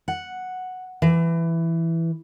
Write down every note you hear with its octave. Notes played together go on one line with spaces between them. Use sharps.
F#5
E3